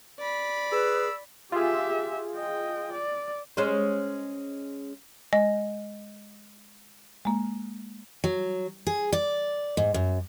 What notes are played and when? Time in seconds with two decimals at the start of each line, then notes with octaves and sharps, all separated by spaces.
0.19 D5 B5
0.72 G#4 B4 E6
1.52 F4 G4 G#4 E5
2.35 D#5 G5
2.92 D5
3.57 G#3 C#4 C5
5.33 G#3 D#5
7.25 G#3 A#3
8.24 F#3
8.87 G#4
9.13 D5
9.77 G#2
9.94 F#2